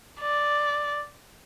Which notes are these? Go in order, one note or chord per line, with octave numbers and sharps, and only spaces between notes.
D5